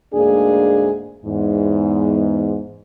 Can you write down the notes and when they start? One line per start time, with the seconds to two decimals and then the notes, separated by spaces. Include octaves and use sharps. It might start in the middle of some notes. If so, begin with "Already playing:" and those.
0.14 D2 G#2 A#3 D4 G#4
1.25 E2 G#2